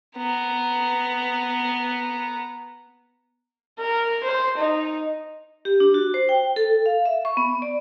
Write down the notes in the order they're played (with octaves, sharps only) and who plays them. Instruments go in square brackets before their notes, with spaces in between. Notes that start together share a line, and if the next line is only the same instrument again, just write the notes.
[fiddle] B3 A#5
[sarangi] A#4
C5
D#4
[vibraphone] G4
D4
F#4
C5
G5
A4
F5
E5
C#6
B3
D5